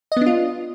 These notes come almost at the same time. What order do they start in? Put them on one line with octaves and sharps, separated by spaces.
D#5 B3 D4 F4